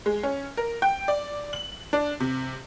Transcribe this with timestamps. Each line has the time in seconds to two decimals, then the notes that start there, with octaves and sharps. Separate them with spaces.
0.06 G#3
0.23 C#4
0.57 A#4
0.82 G5
1.08 D5
1.53 F#7
1.93 D4
2.20 C3